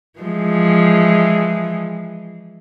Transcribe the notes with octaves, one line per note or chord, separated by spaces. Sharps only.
E3 F3 G#3